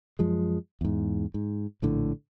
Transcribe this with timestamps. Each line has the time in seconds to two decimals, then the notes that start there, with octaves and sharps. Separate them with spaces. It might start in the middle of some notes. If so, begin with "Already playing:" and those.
0.19 F#2 F3 G#3
0.81 E2 G#2
1.34 G#2
1.82 A#1 A2 D3